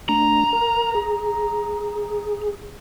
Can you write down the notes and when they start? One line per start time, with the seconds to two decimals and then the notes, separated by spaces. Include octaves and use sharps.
0.09 A3 D4 A#5
0.53 A#4
0.95 G#4